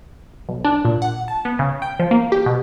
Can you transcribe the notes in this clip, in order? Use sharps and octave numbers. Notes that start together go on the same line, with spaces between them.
B1
D4
A#2
F#5
A5
B3
C#3
G5
F3
A#3
G4
B2